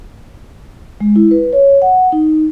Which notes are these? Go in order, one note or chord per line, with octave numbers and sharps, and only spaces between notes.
G#3
E4
B4
C#5
F#5
D#4